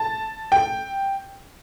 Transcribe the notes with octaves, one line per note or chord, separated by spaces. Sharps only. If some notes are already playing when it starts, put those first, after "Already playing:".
Already playing: A5
G5